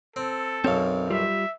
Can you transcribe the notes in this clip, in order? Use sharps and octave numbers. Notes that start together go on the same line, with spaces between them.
C4 A4
B1 F#2 C4 C#5 F5
G3 F4 G4 E5